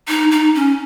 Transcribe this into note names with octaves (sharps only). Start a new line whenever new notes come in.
D#4
D#4
C#4